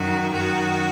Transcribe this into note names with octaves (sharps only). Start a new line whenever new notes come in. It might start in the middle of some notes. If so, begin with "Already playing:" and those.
Already playing: F#2 D#3 F#4
F#2 D#3 F#4